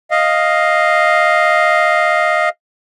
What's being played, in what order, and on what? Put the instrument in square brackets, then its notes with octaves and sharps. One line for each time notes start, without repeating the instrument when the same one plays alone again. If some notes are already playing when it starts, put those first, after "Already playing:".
[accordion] D#5 F5